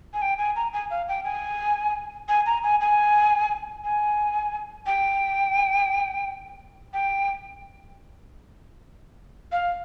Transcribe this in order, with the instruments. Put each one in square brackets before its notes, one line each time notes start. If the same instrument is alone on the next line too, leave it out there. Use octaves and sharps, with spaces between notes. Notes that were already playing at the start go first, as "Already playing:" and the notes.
[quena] G#5
G5
G#5
A#5
G#5
F5
G5
G#5
G#5
A#5
G#5
G#5
G#5
G5
G5
F5